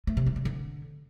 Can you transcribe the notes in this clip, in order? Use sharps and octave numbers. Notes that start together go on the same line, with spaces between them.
A3
C3
G3
A#3
D3